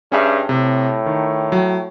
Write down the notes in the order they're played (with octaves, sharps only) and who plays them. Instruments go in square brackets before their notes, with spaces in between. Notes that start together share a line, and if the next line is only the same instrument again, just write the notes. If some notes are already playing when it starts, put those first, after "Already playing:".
[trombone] G2 [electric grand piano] C#4 G#4 E5
[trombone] A2 [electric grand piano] C3
[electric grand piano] D#3
F#3 G5